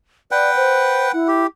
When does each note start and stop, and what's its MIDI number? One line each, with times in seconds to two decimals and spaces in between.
0.31 1.12 71
0.31 0.51 74
0.31 1.12 78
0.31 1.12 79
0.56 1.08 72
1.13 1.46 64
1.13 1.28 78
1.28 1.47 67